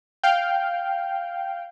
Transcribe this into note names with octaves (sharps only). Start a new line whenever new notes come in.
F5 G5